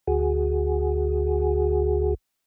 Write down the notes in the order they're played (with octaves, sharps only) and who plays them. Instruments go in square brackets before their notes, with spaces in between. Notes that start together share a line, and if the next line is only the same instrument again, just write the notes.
[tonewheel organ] D2 F#4 G#4